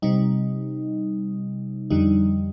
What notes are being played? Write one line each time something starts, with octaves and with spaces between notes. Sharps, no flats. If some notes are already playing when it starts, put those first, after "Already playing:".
C3 G3 D#4
F2 D3 G3 D#4